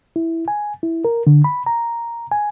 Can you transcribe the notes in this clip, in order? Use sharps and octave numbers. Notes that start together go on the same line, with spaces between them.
E4
G#5
E4
A#4
D3
B5
A#5
G#5